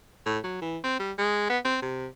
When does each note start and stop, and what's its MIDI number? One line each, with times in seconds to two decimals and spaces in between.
0.26 0.38 45
0.44 0.59 54
0.62 0.78 52
0.84 0.98 60
0.99 1.12 55
1.18 1.46 56
1.49 1.59 59
1.65 1.77 60
1.82 2.07 48